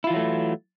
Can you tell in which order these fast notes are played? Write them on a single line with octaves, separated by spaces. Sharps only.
E4 F4 E3 F#3 A3